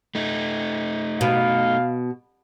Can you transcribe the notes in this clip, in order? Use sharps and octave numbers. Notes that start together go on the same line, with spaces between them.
A3 D#4
B2 F5